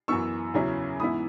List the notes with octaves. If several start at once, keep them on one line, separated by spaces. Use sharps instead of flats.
F#2 E3 B3 C#6 E6
E2 C#3 F#3 C#4 E4
G#2 E3 B3 E4 B5 D#6